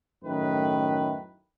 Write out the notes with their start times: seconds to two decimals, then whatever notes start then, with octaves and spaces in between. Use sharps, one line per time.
0.23 F#2 A2 D#3 A3 B4